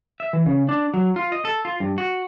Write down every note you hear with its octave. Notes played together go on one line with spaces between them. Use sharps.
E5
E3
C#3
D4
F#3
F4
D#5
A4
F4
G2
F#4